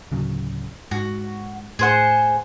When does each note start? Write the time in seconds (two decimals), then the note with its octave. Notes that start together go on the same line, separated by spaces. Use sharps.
0.12 D1 C#3 F#3
0.91 G#2 F#4
1.79 A2 G#4 C5 F#5